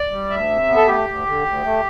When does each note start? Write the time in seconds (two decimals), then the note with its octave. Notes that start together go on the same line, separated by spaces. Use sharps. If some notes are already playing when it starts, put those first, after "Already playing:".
Already playing: D5
0.11 G3
0.30 D2 E5
0.50 C3
0.68 B3
0.76 A4
0.87 A3 G4
1.07 D2
1.26 D3
1.45 D2
1.64 A3